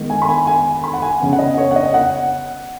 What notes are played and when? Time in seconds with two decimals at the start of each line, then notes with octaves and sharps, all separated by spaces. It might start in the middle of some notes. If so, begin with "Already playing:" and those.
Already playing: D#3 G#3 B3
0.10 G#5
0.22 B5
0.29 G#5
0.47 G#5
0.84 B5
0.93 F#5
1.02 G#5
1.20 C#3 B3
1.33 F#5
1.39 D#5
1.57 C#5
1.71 F#5
1.76 D#5
1.94 F#5